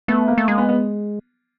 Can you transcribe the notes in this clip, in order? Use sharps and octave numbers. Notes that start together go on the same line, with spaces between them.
A3 B3
A#3
A3
G#3 A#3
B3
B3